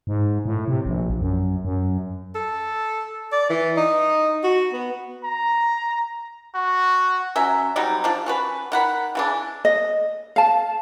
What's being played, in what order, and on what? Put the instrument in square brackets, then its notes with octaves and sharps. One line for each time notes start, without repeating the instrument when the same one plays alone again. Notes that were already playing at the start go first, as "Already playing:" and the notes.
[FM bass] G#2
A2
C3
A#1
F#2
F#2
[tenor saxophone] A4
D5
E3
D#4
F#4
B3
[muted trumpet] A#5
F#4
[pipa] F#3 C#4 E5
F#3 G3 C4 D#4
F3 D4
C#4 F#4 B4
D#3 F#5 B5
C#3 E3 D4
[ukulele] D#5
F5 A5